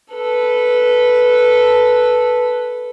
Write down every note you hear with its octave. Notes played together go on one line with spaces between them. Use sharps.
A4 B4